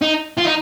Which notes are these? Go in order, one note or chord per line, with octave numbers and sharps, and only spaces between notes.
D#4
F4
D#4